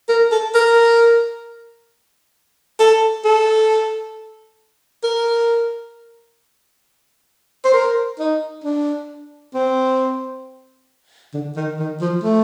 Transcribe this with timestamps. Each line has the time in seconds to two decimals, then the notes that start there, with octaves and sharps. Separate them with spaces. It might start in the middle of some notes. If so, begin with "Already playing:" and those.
0.09 A#4
0.32 A4
0.54 A#4
2.80 A4
3.25 A4
5.04 A#4
7.65 C5
7.74 A#4
8.19 D#4
8.64 D4
9.54 C4
11.34 D3
11.56 D#3
11.79 D#3
12.01 F3
12.23 A3